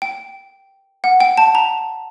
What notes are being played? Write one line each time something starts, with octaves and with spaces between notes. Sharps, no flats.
G5
F#5
G5
A5
A#5